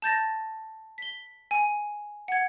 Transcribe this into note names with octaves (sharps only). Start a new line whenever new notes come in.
A5 G6 A6 A#6
B6 G7
G#5
F#5 G#6